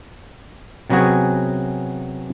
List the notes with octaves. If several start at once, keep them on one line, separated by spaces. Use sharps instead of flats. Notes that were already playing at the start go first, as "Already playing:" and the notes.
C3 F#3 B3 C#4 F#4 G#4